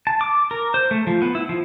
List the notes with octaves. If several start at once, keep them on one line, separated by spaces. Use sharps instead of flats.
A5
D6
A#4
C5
A3
F3
B3
E4
F3